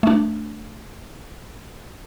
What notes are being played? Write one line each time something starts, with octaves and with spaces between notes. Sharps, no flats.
A3 D4